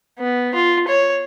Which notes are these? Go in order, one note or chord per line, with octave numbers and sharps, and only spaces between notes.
B3
F4
C#5